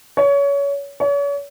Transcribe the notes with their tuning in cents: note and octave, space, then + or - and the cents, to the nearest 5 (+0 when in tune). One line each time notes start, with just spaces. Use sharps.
C#5 +25
C#5 +40